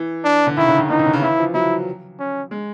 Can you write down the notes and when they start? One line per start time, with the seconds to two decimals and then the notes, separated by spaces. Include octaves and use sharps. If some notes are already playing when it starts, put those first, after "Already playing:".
Already playing: E3
0.24 D4
0.47 D3
0.57 D#3 E4
0.63 C#3
0.68 D3
0.78 D#3
0.90 E3 D#4
0.99 D#3
1.06 D3
1.13 C#3
1.22 E3 E4
1.39 F3
1.54 F#3 E4
2.20 C#4
2.51 G#3